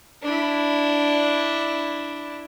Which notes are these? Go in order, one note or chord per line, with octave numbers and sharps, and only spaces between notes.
D4 E4